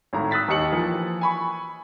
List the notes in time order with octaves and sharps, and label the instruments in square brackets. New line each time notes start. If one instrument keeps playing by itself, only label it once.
[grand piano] G#1 A2 A#5
D#6 E6 F#6 A6 B6
D#2 G4 D#5 C#7 F#7
E3 F3 A#3
G#5 B5 C#6